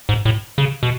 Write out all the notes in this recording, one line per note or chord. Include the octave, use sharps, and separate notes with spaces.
G#2
A2
C#3
B2